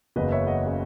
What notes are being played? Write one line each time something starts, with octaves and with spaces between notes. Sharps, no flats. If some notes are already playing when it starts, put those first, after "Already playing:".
F#1 E2 C#3 B4 D#5
C#5 E5
D#5 F#5
C#3